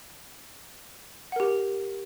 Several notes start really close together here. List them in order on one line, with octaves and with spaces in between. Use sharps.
F#5 A#4 G4